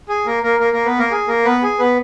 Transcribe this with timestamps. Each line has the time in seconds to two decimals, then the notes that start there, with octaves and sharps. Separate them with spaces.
0.09 G#4
0.26 A#3 A#4
0.43 A#3 A#4
0.60 A#3 A#4
0.73 A#3 A#4
0.85 B3 B4
0.98 A#3 A#4
1.11 G#4
1.28 A#3 A#4
1.45 B3 B4
1.63 G#4
1.79 B3 B4